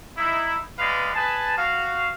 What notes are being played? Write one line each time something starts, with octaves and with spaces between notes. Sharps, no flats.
D#4 E4
G#3 B3 B4 D5 F5
G#4 B4 G#5 A5
F#4 F5